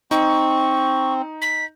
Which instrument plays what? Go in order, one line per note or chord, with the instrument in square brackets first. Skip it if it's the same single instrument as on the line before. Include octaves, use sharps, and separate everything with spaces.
[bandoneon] C4 [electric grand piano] D#4 [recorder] C#6
[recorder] B6